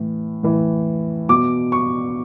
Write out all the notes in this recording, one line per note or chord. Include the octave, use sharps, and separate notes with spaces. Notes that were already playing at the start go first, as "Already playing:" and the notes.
Already playing: A2 E3
A2 E3
B2 D6
C#6